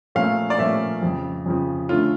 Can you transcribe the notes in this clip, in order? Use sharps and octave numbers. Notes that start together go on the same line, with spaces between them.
A#2 F3 A3 C#4 F5
D5
A#2 F3 A3 C#4 E5
F2 C#3 F3
F2 C#3 F3
D3 A3 C#4 F4